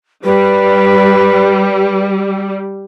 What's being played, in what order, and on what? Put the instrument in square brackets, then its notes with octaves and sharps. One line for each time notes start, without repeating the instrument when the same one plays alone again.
[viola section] G3 [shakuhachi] B4